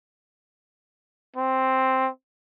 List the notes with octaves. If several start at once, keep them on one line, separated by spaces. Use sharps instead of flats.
C4